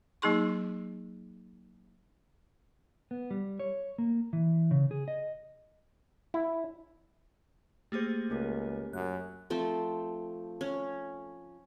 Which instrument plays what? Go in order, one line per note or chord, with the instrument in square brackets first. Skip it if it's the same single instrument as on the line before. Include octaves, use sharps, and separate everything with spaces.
[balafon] F#3 A#3 D#4 G#4 C6 C#6
[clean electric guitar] B3
G3
C#5
A#3
E3
C#3
G#4
D#5
[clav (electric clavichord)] E4
[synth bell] A3 A#3 G#4 [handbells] G4 C5
[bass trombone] C#2 [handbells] C#4 G4 A#4
[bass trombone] F#2 [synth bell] F#6
[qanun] F3 A3 C4
C#4